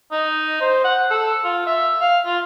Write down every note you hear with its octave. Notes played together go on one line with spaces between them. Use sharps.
D#4
C5
F#5
A4
F4
E5
F5
F4